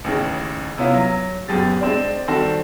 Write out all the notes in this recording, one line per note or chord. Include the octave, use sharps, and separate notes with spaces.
A1 D#2 C#3
C3 B3 C#4 E4 F4
F#3
D#1 F#2 B3 G4 G#4 A6
G#3 C4 D4
D#3 G3 C4 F#4 A4